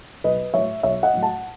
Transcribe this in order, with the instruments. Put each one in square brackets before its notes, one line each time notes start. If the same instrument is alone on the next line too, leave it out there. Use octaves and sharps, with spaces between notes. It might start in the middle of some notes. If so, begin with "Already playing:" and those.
[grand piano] B1 B4 D#5
A2 F#3 C#5 E5
B1 C#5 E5
D#5 F#5
A2 F#3
F#5 A5